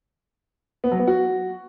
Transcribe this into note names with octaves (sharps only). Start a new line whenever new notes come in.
B3
F#3
B3
F#4